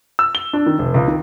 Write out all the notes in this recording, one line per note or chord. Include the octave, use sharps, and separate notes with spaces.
E6
G7
D4
D#3
F1
C#2
D#3